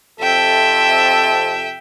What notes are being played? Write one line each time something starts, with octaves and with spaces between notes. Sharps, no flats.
F2 C3 A4 E5 G5